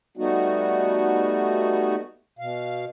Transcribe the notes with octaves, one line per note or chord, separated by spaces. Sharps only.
G3 A3 B3 D#4 F#4
B2 F5